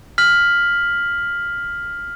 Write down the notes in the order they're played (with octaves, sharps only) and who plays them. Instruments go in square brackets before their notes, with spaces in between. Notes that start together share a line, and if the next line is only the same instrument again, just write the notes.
[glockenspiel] F6 B6 F#7